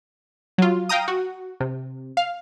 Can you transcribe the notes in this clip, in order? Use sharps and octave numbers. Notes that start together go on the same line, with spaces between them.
F#3 F4
F5 G5 A#5 D#6
F#4
C3
F5